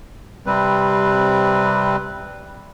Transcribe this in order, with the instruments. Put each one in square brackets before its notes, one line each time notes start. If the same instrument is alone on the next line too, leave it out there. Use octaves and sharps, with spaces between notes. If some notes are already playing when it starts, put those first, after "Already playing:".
[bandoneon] C3 G3 C4 B4